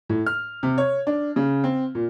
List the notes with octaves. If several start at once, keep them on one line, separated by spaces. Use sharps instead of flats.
A2
F6
C3
C#5
D4
C#3
C4
A#2